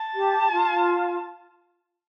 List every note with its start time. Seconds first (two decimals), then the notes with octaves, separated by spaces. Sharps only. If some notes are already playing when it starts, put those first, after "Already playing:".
Already playing: A5
0.15 G4
0.52 F4